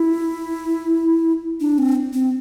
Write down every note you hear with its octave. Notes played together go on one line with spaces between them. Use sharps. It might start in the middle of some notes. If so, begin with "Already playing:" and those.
Already playing: E4
D4
C4
C4